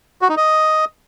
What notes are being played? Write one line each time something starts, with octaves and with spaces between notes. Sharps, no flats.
F#4
D#4
D#5